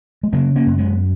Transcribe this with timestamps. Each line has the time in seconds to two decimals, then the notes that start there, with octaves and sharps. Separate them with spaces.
0.23 G#3
0.33 C#3 F#3 A#3
0.55 A#3 C#4
0.66 F#2
0.78 G#3 B3